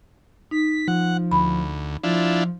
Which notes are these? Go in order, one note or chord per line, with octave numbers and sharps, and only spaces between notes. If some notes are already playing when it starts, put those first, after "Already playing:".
D#4 B6
F3 F#5
D2 B5
F3 D4 E4 F4